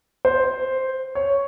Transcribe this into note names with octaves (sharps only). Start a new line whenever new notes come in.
C5
C#5